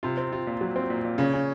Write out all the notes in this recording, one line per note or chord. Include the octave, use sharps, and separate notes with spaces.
C3 F4
C4
F4
A#2
F#3
C4
A#2
A#2
C#3 C#4
C#4